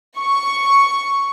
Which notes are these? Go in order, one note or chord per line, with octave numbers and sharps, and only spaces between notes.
C#6